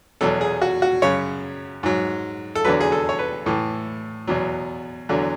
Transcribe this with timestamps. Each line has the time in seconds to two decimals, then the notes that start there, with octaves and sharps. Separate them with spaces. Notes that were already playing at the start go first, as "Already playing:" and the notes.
0.21 E2 B2 F#3 A4
0.41 G#4
0.61 F#4
0.82 F#4
1.02 F#2 C#3 F#3 C#5
1.83 G#2 F#3
2.55 A4
2.65 E2 D3 F#3 B4
2.81 G#4
2.92 A4
3.09 C#5
3.19 B4
3.46 A2 E3 A4
4.27 E2 B2 F#3
5.09 E2 D3 F#3